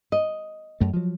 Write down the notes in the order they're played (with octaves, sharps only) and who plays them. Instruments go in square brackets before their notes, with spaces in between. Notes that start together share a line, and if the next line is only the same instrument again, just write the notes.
[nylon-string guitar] D#5
[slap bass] F#2 A3
F3 F#3